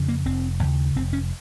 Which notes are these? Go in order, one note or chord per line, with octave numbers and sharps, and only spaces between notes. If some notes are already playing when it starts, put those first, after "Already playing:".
Already playing: F2 C#3
A#3
F1 C4
D#2 C#3
F1 C4
C#4